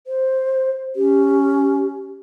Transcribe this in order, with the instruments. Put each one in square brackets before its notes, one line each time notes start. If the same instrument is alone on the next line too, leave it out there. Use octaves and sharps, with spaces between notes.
[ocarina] C5
[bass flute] C#4 [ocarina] G4